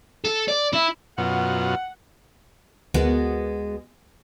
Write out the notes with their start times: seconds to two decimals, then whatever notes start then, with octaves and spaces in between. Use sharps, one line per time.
0.25 A4
0.48 D5
0.73 E4
1.18 F#2 B2 F4 F#5
2.94 D2 G#3 B3 F#4 A#4